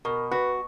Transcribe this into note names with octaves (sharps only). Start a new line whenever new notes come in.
B2 A#4
F#4 B4